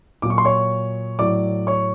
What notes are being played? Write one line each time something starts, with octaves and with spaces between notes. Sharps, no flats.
A#2 F#3 D6
C#6
C6
C#5 C#6
A2 F#3 D5 D6
C#5 C#6